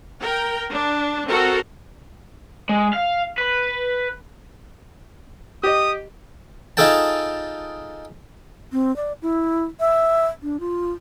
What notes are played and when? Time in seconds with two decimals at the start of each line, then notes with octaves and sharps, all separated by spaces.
0.22 A#4 G5
0.70 D4
1.29 C4 F#4 A4 A#4
2.69 G#3
2.93 F5
3.38 B4
5.63 G4 D#5 D#6
6.77 D#4 F4 G#4 A4 G5 A5
8.71 C4
8.96 D5
9.22 E4
9.80 E5
10.43 D4
10.60 F4